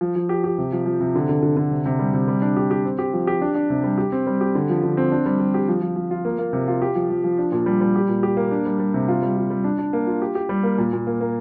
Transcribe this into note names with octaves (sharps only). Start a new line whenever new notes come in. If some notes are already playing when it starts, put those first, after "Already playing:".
F3
F3
G4
G4
C3
F3
F3
C3
D3
D3
D3
D3
C3
C3
G3
C3
G3
D4
G4
G4
C4
G4
F3
G4
D4
D4
C3
G3
G4
C4
G3
G4
D3
F3
D3
C4
D4
G3
G3
G4
F3
F3
F3
F4
A#3
A#3
C3
F4
G4
F3
F3
F3
D4
A#2
G3
G3
G4
A#2
G4
A#3
D4
G3
G3
C3
F4
G3
F4
G3
D4
D4
A#3
F4
G4
G4
G3
A#3
A#2
A#2
A#3
A#3